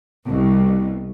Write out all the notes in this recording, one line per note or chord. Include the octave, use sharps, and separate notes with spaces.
C2 B2